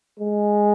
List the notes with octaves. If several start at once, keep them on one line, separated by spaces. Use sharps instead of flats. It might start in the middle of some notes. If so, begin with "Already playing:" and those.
G#3